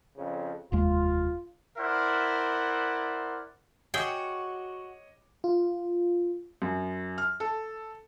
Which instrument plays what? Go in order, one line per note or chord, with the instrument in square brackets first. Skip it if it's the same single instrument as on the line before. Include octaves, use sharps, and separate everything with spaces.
[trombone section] F2 C#3
[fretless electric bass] F1 D#2 G#3 [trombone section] F4
[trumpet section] E4 A#4 C5 D5 E5 F#5
[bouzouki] F#4 [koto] G#4 E5 G5 [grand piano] C#5 D#5 D6
[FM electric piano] F4
[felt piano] F#2
F6
A4